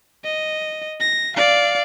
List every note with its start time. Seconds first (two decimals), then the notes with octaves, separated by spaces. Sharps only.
0.24 D#5
1.00 A#6
1.37 D5 F5